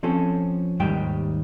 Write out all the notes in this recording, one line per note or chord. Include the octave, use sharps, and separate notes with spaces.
F3 C4 C#4 A4
D#2 G#2 D#3 G3 G5